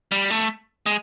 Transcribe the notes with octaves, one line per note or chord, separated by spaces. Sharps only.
G3
A3
G#3